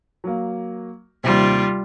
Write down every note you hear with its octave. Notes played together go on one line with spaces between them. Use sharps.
F#3 A#3
D#2 C3 G3 F4